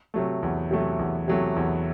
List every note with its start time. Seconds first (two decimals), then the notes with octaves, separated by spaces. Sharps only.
0.14 C3 F#3 A3
0.43 E2
0.71 C3 F#3 A3
0.99 E2
1.28 C3 F#3 A3
1.56 E2